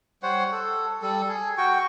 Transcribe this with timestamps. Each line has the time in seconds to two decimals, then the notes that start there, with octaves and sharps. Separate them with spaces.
0.23 G3 C5 C#5 F#5
0.52 A4
1.02 G3 A4
1.28 G#4
1.57 F#4 G5 C#6